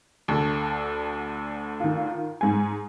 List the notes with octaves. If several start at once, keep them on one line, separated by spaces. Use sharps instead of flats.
D2 D3 A4
D#3 F4
G#2 G#5